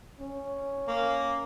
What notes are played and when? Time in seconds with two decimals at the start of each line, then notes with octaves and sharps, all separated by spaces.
0.20 C#4
0.88 A#3